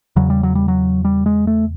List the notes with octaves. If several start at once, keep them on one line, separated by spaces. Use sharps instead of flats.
E2 C#3 F#3
G3
F#3
G3
F#3
G3
G#3
A3